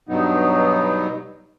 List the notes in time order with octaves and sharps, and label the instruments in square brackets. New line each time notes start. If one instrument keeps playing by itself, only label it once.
[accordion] G2 B2 F#3 B3 D#4